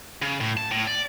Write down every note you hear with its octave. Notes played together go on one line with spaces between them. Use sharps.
C#3
A2
A5
A2
D5